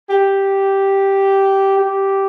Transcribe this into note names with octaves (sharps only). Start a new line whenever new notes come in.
G4
G4